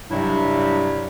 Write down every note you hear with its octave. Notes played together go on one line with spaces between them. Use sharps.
G2 C3 F#3 G3 E4